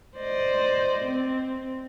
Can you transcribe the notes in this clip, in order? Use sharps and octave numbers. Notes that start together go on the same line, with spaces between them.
C5 D5 D#5
C4